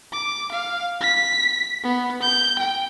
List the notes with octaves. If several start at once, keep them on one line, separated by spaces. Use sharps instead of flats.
D6
F5
B6
B3
G6
G5